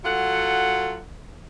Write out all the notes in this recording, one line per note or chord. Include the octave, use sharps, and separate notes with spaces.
F#3 F4 A4 F#5